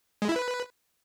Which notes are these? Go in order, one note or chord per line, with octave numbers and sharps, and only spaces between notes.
G#3
E4
B4